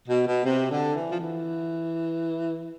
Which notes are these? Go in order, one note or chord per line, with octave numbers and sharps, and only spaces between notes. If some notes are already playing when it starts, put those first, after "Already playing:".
B2
B2
C3
D3
E3
F3
E3